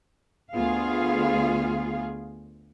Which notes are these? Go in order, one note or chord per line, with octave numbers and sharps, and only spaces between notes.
D2 B3 F4 G#4 F5